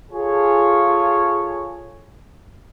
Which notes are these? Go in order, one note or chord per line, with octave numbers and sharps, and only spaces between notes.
F4 G#4 A4 C#5